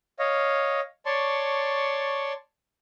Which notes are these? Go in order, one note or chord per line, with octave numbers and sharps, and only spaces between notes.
C#5 D#5 F5
C#5 D5 A5 C6 C#6